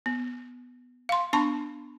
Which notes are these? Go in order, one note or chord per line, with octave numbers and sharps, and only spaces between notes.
B3
F5 C6
B3 D4 A5 B5 C#6